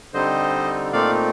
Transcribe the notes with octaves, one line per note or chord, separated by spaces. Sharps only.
D3 G3 C4 D#4 C5 D#5
A#2 A3 C4 D#4 D5 F5